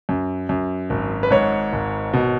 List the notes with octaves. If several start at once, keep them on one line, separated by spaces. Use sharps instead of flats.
F#2
F#2
G#1
B4
G#2 C#5
G#1
B2